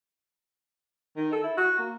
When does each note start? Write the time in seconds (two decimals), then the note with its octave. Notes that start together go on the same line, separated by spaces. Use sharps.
1.17 D#3
1.33 A4
1.44 E4
1.57 F#4
1.79 A#3